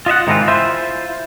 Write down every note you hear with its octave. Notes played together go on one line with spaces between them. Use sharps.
F4 D#5 E5 F#5
G#2 D#3 E3 G#3 C4 F4
E4 F4 C5 E5